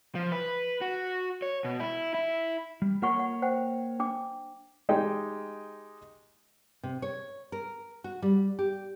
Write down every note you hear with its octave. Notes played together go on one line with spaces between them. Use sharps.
F3
B4
F#4
C#5
B2
E4
E4
G3
A#3 F4 A#4 C#5 F#5 C#6
F#5
C5 F#5 G5
D4 G5 D6
G#3 D#4 G4 G5
C3
C#5
A#4
F#4
G3
G4